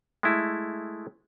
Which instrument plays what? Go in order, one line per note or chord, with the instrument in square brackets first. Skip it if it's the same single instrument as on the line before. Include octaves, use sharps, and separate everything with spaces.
[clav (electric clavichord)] G#3 A3 E4